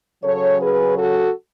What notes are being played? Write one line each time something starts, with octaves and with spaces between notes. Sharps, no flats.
C#3 F#3 C#4 A4 C#5
G#4 B4
F#4 A4